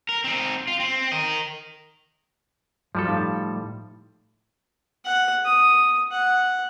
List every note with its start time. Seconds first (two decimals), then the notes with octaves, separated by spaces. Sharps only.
0.09 A#4
0.24 C4 D#4
0.67 F4
0.80 C4
1.12 A#4 D#5
2.95 G2 F3 G3 F#4 A4
3.08 A2 D#4 F5
5.05 F#5
5.45 D#6
6.11 F#5